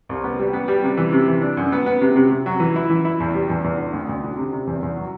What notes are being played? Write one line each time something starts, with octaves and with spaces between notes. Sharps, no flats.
C2
B3
G3
B3
G3
C3
E3
C3
E3
D4
F#2
B3
B3
C3
C3
C3
F#3
E3
E4
E3
E4
E2
G3
E2
E2
D3
D2
D2
D3
C3
C3
E2
E2
F#3